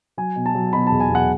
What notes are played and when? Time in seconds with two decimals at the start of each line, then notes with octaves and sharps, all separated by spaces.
0.17 F#3 G#5
0.36 B2
0.46 A5
0.55 F#3
0.73 B2 B5
0.87 A5
0.92 E2
1.00 G#5
1.10 E2
1.15 F#5